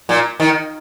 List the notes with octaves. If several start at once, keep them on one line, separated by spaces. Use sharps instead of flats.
A#2
D#3